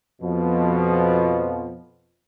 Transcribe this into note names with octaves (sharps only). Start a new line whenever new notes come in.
F2 B2 F3